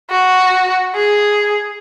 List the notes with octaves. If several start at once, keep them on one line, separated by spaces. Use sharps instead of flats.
F#4
G#4